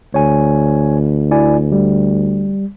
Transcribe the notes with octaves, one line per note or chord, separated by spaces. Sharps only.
D2 C#5 G#5
E4 D5 G#5
G3